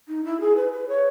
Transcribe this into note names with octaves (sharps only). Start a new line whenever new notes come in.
D#4
E4
G#4
B4
B4
C#5